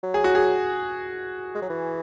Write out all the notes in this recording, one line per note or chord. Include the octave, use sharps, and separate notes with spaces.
F#3
G#4
F#4
G#4
G#3
F#3
E3